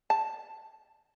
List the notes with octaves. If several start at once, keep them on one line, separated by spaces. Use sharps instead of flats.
A5